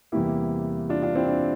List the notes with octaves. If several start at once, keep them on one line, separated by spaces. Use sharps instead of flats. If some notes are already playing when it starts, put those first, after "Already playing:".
E2 C3 G3 A#3 E4 G4
D4 F4
D4 F4
C4 E4
D4